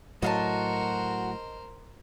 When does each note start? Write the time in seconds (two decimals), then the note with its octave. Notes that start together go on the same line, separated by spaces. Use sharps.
0.22 A2 F#3 F#4 A#4 C5 D#5 F5 A5